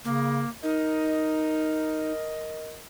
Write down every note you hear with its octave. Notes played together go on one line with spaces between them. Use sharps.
C#3 A#3
D#4 A#4 D#5